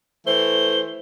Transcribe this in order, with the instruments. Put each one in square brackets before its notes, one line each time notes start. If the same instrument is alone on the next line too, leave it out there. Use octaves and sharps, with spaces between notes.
[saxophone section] E3 A3 C5 [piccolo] G7